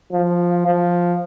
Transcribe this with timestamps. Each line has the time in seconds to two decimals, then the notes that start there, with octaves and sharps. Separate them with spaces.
0.12 F3
0.67 F3